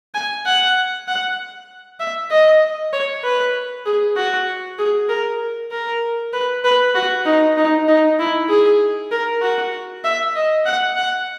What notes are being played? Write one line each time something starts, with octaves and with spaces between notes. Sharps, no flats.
G#5
F#5
F#5
E5
D#5
C#5
B4
G#4
F#4
G#4
A#4
A#4
B4
B4
F#4
D#4
D#4
D#4
E4
G#4
A#4
F#4
E5
D#5
F#5
F#5